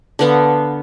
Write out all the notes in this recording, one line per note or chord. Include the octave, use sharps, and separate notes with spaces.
D3 B3 F5